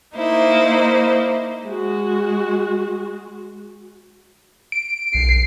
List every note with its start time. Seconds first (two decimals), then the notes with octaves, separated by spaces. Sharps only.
0.15 A#3 D#4 E4 C5
1.66 G#3 F#4
4.72 D7
5.14 B1 C7